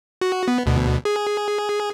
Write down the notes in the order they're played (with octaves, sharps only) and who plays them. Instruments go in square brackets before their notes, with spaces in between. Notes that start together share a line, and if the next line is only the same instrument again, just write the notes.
[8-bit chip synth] F#4
B3
D2 B2
G#4